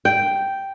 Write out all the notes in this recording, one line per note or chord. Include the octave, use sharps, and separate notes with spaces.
G5